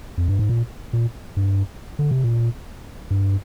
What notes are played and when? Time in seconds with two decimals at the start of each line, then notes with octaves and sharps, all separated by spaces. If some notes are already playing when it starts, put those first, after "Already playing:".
0.18 F2
0.28 G2
0.39 G#2
0.49 A#2
0.93 A#2
1.37 G2
1.99 D3
2.11 C3
2.23 A#2
3.11 G2